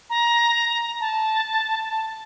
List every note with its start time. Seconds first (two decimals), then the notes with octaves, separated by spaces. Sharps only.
0.10 A#5
1.01 A5
1.89 A5